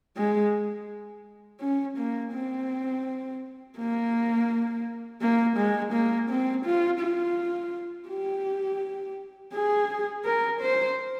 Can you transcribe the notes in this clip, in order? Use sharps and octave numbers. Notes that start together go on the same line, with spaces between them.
G#3
C#4
A#3
C4
A#3
A#3
G#3
A#3
C4
F4
F4
G4
G#4
A#4
C5